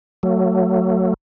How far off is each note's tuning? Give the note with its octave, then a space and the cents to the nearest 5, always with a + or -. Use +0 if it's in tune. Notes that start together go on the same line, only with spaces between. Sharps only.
F#3 +5 A3 +30